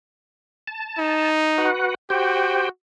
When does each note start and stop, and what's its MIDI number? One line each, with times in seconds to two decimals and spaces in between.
0.67 1.31 81
0.99 1.69 63
1.58 1.95 66
1.58 1.95 71
1.58 1.95 78
2.10 2.68 66
2.10 2.69 67
2.10 2.69 72
2.10 2.69 79